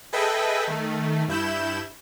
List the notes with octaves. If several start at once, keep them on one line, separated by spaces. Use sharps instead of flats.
G#4 A4 B4 D#5 E5 G5
D#3 A3
G2 E4 G6 E7